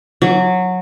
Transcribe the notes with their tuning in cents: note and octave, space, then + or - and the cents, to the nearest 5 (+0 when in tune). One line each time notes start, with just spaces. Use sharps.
F#3 -15